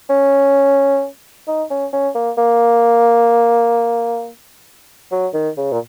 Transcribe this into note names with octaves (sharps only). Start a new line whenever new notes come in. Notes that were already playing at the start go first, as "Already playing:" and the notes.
C#4
D#4
C#4
C#4
A#3
A#3
F#3
D#3
C#3
A#2